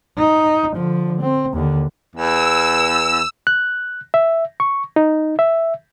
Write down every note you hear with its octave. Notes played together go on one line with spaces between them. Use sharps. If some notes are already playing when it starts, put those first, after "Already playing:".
D#4
D3 F3
C4
D#2 D3
E2 E6
F#6
E5
C#6
D#4
E5